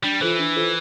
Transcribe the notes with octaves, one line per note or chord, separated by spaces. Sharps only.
G3 D4
E3 F4 A4 C5
D4
F4 A4 C5